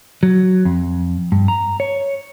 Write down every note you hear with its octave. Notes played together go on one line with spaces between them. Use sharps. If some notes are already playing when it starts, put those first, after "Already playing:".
F#3
F2
G2
A#5
C#5